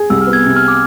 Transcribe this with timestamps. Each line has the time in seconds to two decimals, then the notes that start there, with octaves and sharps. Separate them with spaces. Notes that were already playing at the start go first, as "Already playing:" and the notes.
Already playing: G#4
0.10 C2 E6
0.21 F6
0.27 B3
0.33 G#6
0.45 C3 G#6
0.56 F6
0.68 D6